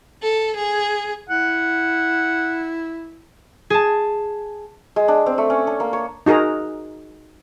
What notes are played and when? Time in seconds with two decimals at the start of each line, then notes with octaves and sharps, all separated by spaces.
0.23 A4
0.57 G#4
1.29 E4 F#5
3.70 G#4 A5
4.96 G#3
5.08 D4
5.26 C4
5.38 A3
5.50 C#4
5.67 D4
5.80 A#3
5.93 C#5
6.26 D#4 F#4 G#4 A#4 A#5